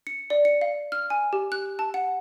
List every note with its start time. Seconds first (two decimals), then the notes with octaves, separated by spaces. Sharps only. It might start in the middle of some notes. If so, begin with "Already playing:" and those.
0.07 C#7
0.30 D5
0.45 C#7
0.61 F5
0.92 F6
1.10 G#5
1.33 G4
1.52 F#6
1.79 A5
1.94 F#5